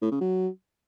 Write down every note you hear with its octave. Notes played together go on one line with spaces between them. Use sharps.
A2
C#3
F#3